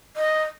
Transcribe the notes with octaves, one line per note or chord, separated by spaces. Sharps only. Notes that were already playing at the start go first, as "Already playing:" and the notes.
D#5